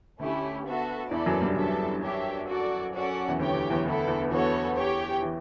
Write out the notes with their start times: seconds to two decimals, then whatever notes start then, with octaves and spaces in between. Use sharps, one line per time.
0.19 D2 D3 A3 C#4 E4 G4
0.65 B3 F#4 A4 E5 A5
1.11 E2 E3 E4 A4 D5
1.26 F#2 F#3
1.41 G2 G3
1.56 F#2 F#3 D4 A4 E5 A5
2.02 D4 G4 C#5 E5
2.48 F#4 A4 D5
2.94 C#4 F#4 A4 D5 F#5
3.28 E2 E3
3.39 D2 D3 G4 C#5 G5
3.54 D2 D3
3.70 E2 E3
3.85 D2 D3 B3 E4 A4
4.08 E2 E3
4.31 E2 E3 B3 F#4 A4 C#5
4.76 G4 C#5 G5
5.22 E3